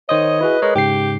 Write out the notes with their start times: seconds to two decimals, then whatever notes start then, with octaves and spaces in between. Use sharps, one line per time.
0.09 D#3 C5 C#5 D#5 D#6
0.41 E4 F#4 G#4 B4
0.62 G#3 A#4 C#5 D#5
0.75 G#2 C#3 G4 G5 C7